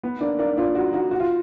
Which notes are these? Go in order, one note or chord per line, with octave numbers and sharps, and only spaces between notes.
B3
A#3 D4
A#3 D4
D4 F4
D#4 F#4
D#4 F#4
F#4
F4